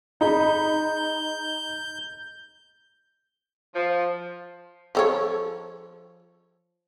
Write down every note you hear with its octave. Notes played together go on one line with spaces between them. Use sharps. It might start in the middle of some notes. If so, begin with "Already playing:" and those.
D#4 G#4 B5 G6
F3
F3 A4 C#5